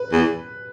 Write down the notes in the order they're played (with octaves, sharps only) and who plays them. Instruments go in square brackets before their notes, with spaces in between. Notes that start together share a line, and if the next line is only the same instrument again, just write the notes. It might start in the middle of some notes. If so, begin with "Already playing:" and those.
Already playing: [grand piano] B4
[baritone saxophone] E2